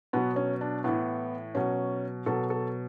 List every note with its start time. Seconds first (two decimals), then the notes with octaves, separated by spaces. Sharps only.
0.13 B2 F#3 B3
0.36 C#4
0.61 D4
0.84 A2 E3 B3
1.55 B2 F#3 C#4
2.26 B2 F#3 A4
2.50 A4